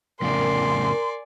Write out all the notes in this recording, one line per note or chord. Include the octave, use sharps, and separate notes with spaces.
F2 A2 C#3 A#4 D5 G#5 C6